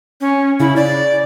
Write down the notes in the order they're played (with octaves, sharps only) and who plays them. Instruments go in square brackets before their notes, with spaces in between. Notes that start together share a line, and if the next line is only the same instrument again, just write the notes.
[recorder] C#4
[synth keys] C#3 [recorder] E4
[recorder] D5